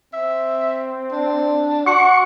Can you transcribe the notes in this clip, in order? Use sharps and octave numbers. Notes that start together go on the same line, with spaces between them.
C4 E5
D4
F#4 F#5 C#6